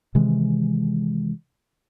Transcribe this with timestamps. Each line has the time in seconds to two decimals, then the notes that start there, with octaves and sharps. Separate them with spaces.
0.15 C3 D#3 E3 G#3